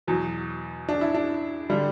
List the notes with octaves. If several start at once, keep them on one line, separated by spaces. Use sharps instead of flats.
E2 B2 F#3
D4
E4
D4
D3 G3